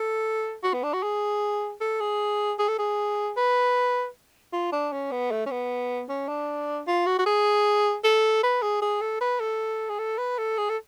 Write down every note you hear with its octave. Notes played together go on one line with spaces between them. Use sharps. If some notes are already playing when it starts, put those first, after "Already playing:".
Already playing: A4
F#4
B3
D4
F#4
G#4
A4
G#4
G#4
A4
G#4
B4
F4
D4
C#4
B3
A3
C#4
B3
C#4
D4
F4
F#4
F#4
G#4
A4
B4
G#4
G#4
A4
B4
A4
G#4
A4
B4
A4
G#4
A4